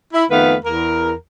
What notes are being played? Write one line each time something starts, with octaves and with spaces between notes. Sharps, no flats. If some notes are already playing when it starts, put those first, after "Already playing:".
E4
F2 D#3 A3 B3 B4 F5
E2 A#4